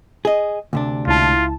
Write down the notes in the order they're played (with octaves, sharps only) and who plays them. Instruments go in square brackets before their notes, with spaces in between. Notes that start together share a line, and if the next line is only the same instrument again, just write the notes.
[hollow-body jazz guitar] G#4 D#5
D2 C3 D4
[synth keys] C#2 E4 A5 [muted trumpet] F4